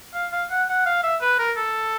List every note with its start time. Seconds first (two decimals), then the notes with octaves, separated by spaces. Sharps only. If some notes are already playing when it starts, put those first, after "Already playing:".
0.14 F5
0.32 F5
0.50 F#5
0.68 F#5
0.86 F5
1.03 E5
1.22 B4
1.39 A#4
1.57 A4